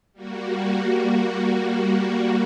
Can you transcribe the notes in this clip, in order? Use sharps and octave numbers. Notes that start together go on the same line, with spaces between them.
G3 A#3 F#4